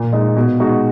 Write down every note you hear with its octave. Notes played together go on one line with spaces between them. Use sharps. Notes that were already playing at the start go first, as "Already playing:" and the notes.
Already playing: A#2
G#3 D#4
B2
G#3 D#4 F#4